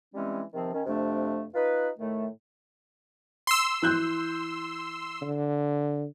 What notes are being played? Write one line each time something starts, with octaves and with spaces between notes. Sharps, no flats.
E3 G3 G#3 C4 C#4
C3 D#3 F3 C4
D#3 C#4
F2 C3 A3 D4
D#4 F4 B4
A2 D#3 A3
C6 E6
E3 F#6 G6
D3